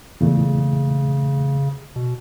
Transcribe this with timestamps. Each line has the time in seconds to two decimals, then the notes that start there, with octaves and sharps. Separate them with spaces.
0.21 E2 A#2 C#3 A3
1.96 B2